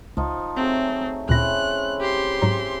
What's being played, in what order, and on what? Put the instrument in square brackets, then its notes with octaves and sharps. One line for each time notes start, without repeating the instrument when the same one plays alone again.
[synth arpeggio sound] C#2 [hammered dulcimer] F3 D#4
[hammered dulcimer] F#3 A3 G#4 [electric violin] C4
[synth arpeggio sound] D2 A#2 A#6 [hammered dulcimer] C#3 C4 E4 [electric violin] F#6
[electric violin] G4 C6
[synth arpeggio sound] G#2 F#3 A#5